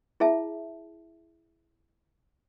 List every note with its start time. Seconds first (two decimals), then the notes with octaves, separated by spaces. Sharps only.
0.20 E4 G#4 E5 A5